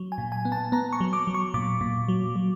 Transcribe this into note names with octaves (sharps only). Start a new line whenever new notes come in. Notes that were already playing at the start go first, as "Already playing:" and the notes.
Already playing: F#3
G#5
A#2
G#5
B3
A5
B3 A#5
C#6
F#3
D6
F#3
C#6
A#2 D6
A#2
F#3
F#3